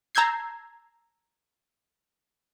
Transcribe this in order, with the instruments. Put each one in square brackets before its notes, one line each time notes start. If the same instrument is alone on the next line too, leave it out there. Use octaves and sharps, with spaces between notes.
[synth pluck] A5 A#5 E6 G6 G#6 C7